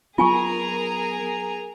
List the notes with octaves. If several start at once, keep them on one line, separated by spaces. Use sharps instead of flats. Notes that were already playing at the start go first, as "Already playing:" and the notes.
F#3 B3 F4 G#4 A#4 G#5 A#5 C#6